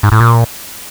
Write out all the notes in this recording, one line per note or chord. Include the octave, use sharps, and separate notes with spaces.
G#2
A2
A#2